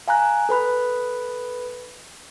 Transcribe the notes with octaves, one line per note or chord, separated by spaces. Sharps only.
F5 G#5 A#5 F#6
A4 B4 B5 F#6